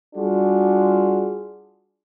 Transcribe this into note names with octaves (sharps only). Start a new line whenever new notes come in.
G3 D4 F4 F#4 G#4